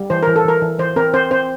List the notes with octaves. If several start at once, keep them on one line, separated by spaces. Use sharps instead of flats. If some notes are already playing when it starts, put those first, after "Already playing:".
Already playing: G3
E3 C5
E3 A#4
A4
E3 A#4
E3
E3 C5
C4 A#4
C4 C5
C4 C5